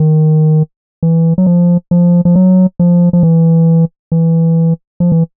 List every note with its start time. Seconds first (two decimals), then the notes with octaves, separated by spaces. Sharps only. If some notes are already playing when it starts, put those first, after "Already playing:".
Already playing: D#3
1.03 E3
1.38 F#3
1.46 F3
1.91 F3
2.25 F3
2.36 F#3
2.79 F3
3.13 F3
3.23 E3
4.12 E3
5.00 F3
5.12 E3